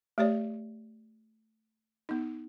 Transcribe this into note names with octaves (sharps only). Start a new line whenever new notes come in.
A3 G4 C#5 D5
B3 D#4